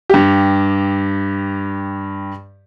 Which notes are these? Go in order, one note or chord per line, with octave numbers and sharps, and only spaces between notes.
G2 G4